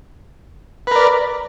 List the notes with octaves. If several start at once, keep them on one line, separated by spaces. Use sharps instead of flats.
A#4 B4 D5